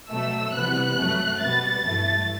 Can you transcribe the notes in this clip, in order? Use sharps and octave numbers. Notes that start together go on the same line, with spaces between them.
B2 F#3 A3 E6
C3 E3 G3 B3 F#6
F#2 F#3 A3
B2 G3 B3 A6
G2 E3 A3